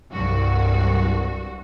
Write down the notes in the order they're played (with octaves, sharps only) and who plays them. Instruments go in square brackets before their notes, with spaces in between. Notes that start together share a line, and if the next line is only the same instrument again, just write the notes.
[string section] C2 G2 F#4